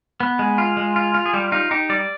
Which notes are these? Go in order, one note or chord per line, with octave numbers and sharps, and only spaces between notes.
B3
G#3
F4
G#3
F4
F4
G#4
G3 G4
D#4 F4
D#4 G4
G3 D5